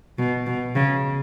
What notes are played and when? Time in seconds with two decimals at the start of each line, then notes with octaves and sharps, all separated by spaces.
0.18 B2
0.47 B2
0.75 C#3